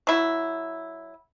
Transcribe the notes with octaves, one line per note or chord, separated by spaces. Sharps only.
F#3 E4